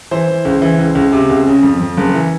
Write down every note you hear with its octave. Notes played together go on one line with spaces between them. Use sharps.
E3 C5
E3
C#2
E3
C#2
C#2
C3
C#2
C#3
F2
F2
F#1
E3